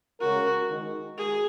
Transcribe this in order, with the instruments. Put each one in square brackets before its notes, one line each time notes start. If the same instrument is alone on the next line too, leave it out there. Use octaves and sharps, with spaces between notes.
[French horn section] C#3 G#3 C#4 A#4 [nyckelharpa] F#4
[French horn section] D#3 G#3 D#4 A#4
[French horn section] G#3 F#4 A#4 [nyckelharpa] G#4